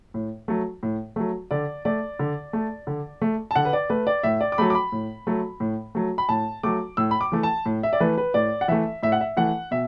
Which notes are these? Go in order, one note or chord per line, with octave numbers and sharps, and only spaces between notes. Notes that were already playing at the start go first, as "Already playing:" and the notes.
A2
F#3 A3
A2
F#3 A3
D3 D5
A3 D5
D3
A3
D3
A3
A5
D3 F#5
B4
D5
A3 B4
D5
A2 E5
D5
D6
F#3 A3 B5
D6
B5
A2
F#3 A3
A2
F#3 A3
B5
A2 A5
F#3 A3 D6
A2 E6
B5
D6
E3 A3
A5
A2
E5
D5
E3 A3 B4
B4
A2 D5
F#5
E3 A3 E5
A2 E5
F#5
E5
E3 A3 F#5
B2 E5